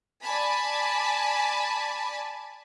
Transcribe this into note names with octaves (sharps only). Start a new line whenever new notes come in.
D5 G#5 A5 B5